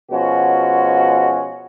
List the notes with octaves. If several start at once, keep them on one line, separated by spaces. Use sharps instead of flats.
B2 F3 G#3 C#4 F#4